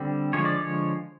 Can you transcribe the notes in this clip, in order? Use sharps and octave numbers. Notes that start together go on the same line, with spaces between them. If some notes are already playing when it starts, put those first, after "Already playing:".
Already playing: D3 G3 C4
D3 F3 G#3 C#5
D5
C#5